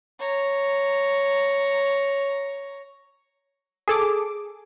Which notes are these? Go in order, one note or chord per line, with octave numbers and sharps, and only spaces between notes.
C#5 A#5
G#4 A4 D6